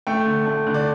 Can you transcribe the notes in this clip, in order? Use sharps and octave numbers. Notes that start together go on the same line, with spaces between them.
A3 G5
D3
A3
D3
D5